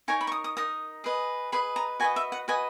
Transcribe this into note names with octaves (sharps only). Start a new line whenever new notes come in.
D#4 A#4 C#5 G#5
B5
C#6
D#6
D#6
D#4 A#4 D#6
G#4 B4 D#5
G#4 B4 D#5 B5
A#5
F#4 B4 D#5 G#5
E5
F#5
F#4 B4 D#5 G#5